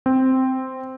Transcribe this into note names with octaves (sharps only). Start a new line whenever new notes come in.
C4